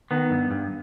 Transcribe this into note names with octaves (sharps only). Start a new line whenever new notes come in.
D#3 B3
G2
G2